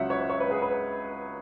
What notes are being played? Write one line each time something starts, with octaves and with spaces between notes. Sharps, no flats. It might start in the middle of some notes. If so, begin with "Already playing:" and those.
Already playing: C#2 C#3 F#3 C#4 E5 F#5
C#5
C#5
B4
G#4
B4